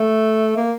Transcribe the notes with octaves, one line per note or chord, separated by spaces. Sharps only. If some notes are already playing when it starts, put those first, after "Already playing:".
Already playing: A3
A#3